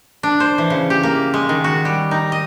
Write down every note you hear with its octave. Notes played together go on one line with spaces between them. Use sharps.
D4
C5
E3
C#3
G4
A#3
G#3
D#3
F#4
G3
D#4
D#5